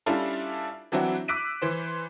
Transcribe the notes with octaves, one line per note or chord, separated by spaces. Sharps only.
G3 C#4 D4 E4 F4 A4
E3 F#3 C4 D4 E4 F#4
D6 E6 F#6 B6 D7 D#7
E3 C5